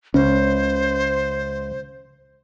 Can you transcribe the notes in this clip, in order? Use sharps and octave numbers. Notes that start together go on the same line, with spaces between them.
C#2 C#4 C5